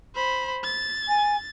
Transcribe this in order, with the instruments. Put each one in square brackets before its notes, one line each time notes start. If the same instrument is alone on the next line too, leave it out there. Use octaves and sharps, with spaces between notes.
[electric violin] C5 B5
A6
[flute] G#5